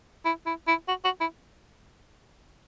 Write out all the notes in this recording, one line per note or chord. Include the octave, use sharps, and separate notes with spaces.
E4
E4
E4
F#4
F#4
E4